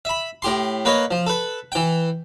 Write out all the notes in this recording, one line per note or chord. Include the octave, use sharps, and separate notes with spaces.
E5 B5
A2 G4 C6
A#3 B4 C#5 D#5
F3
A4 B4
E3 G5